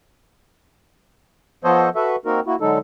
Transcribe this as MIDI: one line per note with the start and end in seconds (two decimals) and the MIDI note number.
1.64 1.89 53
1.64 1.89 59
1.64 1.89 69
1.64 1.89 72
1.64 1.89 73
1.64 1.89 75
1.95 2.16 66
1.95 2.16 69
1.95 2.16 71
1.95 2.16 76
2.26 2.40 58
2.26 2.40 60
2.26 2.40 63
2.26 2.40 66
2.26 2.40 70
2.47 2.55 58
2.47 2.55 64
2.47 2.55 66
2.61 2.78 50
2.61 2.78 54
2.61 2.78 56
2.61 2.78 63
2.61 2.78 69